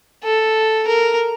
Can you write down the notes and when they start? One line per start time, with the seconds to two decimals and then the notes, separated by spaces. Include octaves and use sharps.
0.24 A4
0.88 A#4